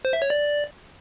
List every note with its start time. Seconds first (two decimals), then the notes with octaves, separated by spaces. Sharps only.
0.05 C5
0.13 E5
0.22 C#5
0.30 D5